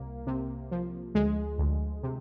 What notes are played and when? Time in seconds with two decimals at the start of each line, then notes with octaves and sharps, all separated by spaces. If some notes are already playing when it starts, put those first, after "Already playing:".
Already playing: C2 A#3
0.27 C3
0.71 F3
1.15 D2 G#3
1.59 D2
2.03 C3